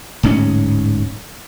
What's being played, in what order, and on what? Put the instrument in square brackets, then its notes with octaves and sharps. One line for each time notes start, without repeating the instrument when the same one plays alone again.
[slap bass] D1 G#2 B3 C#4